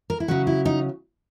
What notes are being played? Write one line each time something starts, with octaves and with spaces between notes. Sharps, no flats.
A#4
E4
C#3 F#3 C#4 F#4
E4
D#4